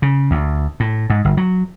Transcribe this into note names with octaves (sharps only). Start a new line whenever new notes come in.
C#3
D2
A2
G#2
G1
F#3